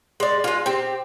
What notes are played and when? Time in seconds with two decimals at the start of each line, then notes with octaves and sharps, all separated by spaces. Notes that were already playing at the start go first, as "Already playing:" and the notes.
0.20 G#3 D5
0.44 G#3 F4
0.66 C4 G4